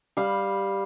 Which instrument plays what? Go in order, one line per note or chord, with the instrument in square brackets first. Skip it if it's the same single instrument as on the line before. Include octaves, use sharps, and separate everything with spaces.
[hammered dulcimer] G3 F5 B5